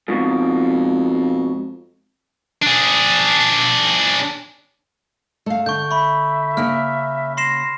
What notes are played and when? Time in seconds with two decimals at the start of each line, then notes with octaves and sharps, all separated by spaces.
0.08 F2 G#2 B2 A#3
2.62 D4 G#4
5.46 A3 F5
5.66 D3 C#6 G6
5.91 E5 B5 C#6
6.57 C#3 A#3 F6
7.37 C6 A#6 C7 E7